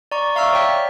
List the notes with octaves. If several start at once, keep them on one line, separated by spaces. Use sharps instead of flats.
D5 A#5 C#6
E5 F5 A#5 C#6 E6 F6
C#5 D5 G5 B6